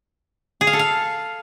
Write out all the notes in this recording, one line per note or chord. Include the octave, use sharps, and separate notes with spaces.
G#4
F5
A4
F5